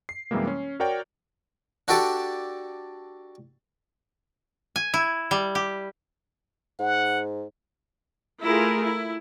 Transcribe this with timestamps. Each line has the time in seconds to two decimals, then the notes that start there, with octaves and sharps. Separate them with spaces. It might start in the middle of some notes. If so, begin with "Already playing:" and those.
0.09 C7
0.31 F#2 C3 E3 G3 G#3 A#3
0.47 C#4
0.80 F#4 A#4 C#5 D5 G5
1.88 D4 F#4 G4 A4 D5 A5
4.76 G#5
4.94 E4
5.31 G3
5.55 G4
6.80 G#2 F#5
8.44 A3 E4 F4 G#4 A#4
8.84 E4